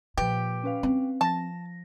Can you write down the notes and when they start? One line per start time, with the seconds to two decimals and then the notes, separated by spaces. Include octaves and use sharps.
0.18 A#2 F3 G4 B4
0.64 C#4 B4 F5
0.83 C4
1.21 F3 A5 A#6